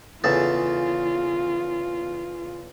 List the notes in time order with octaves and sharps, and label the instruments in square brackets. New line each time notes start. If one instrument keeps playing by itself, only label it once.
[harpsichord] E2 C#3 A4 [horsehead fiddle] F4